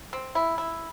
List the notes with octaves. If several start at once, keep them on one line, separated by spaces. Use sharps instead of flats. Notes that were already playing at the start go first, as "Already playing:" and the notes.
C4
E4
E4